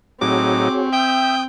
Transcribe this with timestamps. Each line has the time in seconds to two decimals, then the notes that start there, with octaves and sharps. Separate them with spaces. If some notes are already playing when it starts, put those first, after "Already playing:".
0.21 A2 F#3 C4 D#4 F#4 G#4 C#5 D6
0.93 E5 G5 D#6 G6